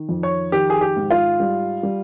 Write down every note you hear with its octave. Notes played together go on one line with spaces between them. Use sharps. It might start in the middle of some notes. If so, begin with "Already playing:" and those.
Already playing: D#3
F2
C#5
D#3 G4
G#4
G4
G#2
F4
G3
G3